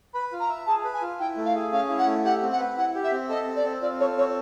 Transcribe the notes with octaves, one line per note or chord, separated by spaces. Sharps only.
B4 B5
F4
A#5
E5
G#4 A5
B4
G#5
F4
E4 G5
A3
F5
G#4
C#4 F5
E4
F#5
A3
G4 F#5
C4
F#5
B4
E4 F#5
G4
E5
C4
A4 D#5
C4
D5
C4
F4 D5
A4 C#5
C4 C#5